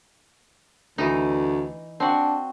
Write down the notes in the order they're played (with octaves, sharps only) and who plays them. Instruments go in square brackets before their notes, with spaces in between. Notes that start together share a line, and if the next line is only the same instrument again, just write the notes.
[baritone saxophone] D2 [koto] E3 D#4
[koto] C4 F#4 [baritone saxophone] D4